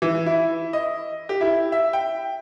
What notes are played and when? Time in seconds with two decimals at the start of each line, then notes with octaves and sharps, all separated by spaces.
0.02 E3
0.26 E4
0.73 D#5
1.29 G4
1.41 E4
1.72 E5
1.93 G5